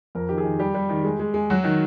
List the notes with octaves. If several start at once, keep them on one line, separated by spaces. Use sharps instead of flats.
F2 A#4
D#3 G4
G#4
D#3
G3 G4
G3
D#3
G#3
G#3
G#3
F#3 F#4
D#3